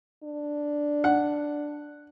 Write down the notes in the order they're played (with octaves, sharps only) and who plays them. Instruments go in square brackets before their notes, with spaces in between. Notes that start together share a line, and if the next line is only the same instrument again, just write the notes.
[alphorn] D4
[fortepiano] F#5